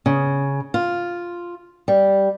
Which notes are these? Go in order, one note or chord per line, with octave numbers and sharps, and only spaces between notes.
C#3
F4
G3